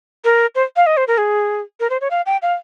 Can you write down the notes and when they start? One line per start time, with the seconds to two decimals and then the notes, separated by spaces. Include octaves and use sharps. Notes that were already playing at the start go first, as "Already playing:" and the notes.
0.24 A#4
0.55 C5
0.76 F5
0.86 D#5
0.97 C5
1.08 A#4
1.18 G#4
1.80 A#4
1.90 C5
2.01 C#5
2.11 F5
2.26 G5
2.42 F5